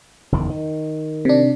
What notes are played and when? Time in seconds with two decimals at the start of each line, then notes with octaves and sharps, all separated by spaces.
0.32 F#1 E2 D#3
0.50 D#3
1.25 C3 D4